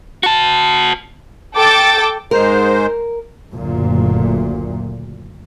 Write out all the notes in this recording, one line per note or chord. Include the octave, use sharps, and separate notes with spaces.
F#4 A5
A4 G5 D6 A6
G#2 G#3 A#4 C5
F#1 D2 A#2